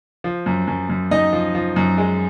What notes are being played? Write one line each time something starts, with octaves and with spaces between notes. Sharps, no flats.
F3
F#2
F#2
F#2
F#2 D#4 D#5
F3
F3
F#2
G#3